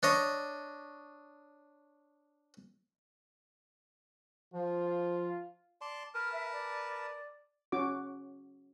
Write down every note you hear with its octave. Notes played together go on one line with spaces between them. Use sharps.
D4 C#5 D#5
F3 F4
D5 A5 C6
A#4 B4 A5 F6
E5
D5
C#4 F#4 D6